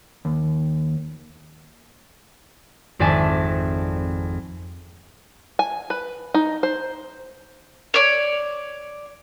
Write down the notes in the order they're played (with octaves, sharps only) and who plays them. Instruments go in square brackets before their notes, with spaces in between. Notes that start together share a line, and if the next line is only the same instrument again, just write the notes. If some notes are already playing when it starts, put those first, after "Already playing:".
[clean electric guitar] D#2
[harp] G#1 F2 D5 E5 G#5 A5
[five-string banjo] G#5
B4
D#4
C5
[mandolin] C#5 D5